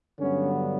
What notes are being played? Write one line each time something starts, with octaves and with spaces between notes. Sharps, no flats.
G2 D3 F#3 B3 C#4